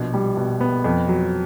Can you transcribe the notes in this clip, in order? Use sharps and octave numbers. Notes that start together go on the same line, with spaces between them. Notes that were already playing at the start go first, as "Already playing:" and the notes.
Already playing: A#1 B2
G3
B2
B3
F2
F#3